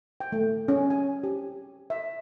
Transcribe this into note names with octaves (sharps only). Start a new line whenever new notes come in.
G5
A3
C#4
G#5
G4
E5